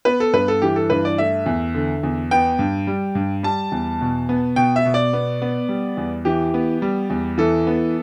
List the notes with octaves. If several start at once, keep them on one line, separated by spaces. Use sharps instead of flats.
B3 B4
A4
G2 B4
A4
E3 G4
A4
G2 B4
D5
A3 E5
E2
D3
E2
B3 G5
G2
G3
G2
G3 A5
E2
B2
B3
B2 G5
E5
B2
D5
B3
B3
G3
E2
E3 G4
B3
G3
E2
E3 A4
B3